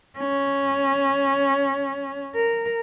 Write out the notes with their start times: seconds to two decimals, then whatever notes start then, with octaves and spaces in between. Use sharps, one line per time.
0.19 C#4
2.35 A#4